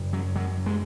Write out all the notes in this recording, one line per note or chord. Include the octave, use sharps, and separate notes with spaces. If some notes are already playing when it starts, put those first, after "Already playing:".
Already playing: F#2 C#3
F#3
F#3
G#3